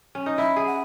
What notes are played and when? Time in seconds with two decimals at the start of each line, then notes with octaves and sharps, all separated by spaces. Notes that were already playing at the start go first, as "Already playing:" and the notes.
0.15 C#4
0.26 D#4
0.37 E4 E5
0.56 G#4
0.66 F#5